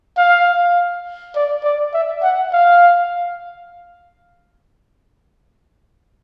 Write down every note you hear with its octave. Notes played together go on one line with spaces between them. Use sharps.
F5
D5
D5
E5
F#5
F5